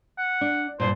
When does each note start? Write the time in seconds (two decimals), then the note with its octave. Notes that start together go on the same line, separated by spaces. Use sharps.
0.18 F#5
0.41 D4
0.80 G2 A#2 C5